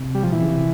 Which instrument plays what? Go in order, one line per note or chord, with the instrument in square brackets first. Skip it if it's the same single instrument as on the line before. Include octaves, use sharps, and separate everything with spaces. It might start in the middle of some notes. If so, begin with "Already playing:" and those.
Already playing: [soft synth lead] C3
[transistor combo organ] G3
F3
[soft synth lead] A#2 [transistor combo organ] E3
[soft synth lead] C#3
C3